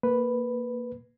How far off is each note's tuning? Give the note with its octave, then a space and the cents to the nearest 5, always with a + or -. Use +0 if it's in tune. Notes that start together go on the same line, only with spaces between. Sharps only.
A#3 -10 B4 +0